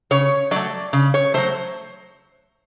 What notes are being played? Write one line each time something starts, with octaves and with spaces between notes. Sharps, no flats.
C#3 C#5
F#3 A3 D5
C#3
C#5
F#3 A3 C5